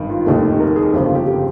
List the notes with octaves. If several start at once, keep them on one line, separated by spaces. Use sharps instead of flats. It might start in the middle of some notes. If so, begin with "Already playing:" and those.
Already playing: G#1 G2 D#3
F4
F1 D#2 D#3 G4
A#4
G#4
G1 F2 C#3 G4
F4
G4
G4